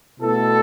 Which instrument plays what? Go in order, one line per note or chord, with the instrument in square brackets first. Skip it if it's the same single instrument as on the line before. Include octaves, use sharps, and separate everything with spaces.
[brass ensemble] B2 A3 E4 A4